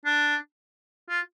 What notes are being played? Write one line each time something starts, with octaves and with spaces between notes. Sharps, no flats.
D4
F4